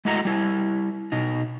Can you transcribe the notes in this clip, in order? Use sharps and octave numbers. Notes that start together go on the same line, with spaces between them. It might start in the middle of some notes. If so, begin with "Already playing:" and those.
G#3 A3 E4 F#4 D#5 A#5
G3 E4
B2 D#4